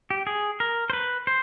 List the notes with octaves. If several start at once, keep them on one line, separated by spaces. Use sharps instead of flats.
G4
G#4
A#4
C5
B4
C5